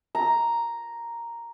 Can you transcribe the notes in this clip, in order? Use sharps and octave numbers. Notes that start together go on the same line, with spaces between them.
A#5